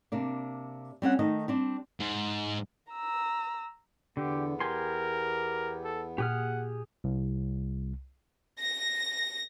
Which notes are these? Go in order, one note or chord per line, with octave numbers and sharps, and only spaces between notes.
C3 A#3 D4
G3 C4 C#4 F#5
D#3 A3 D#4 D#5
G3 C4 D4
G#2
A#5 E6
E2 D3 B3 G4
G4 A#4 G#5 C6
A4
A#2 G4 G#4 F#5 F6
C2
A#6